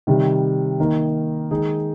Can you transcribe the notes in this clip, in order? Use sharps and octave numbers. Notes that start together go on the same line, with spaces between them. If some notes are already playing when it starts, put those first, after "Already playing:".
C3 D#3 G3
D#3 A#3 D#4 A#4
D#3 G#3 D#4 G#4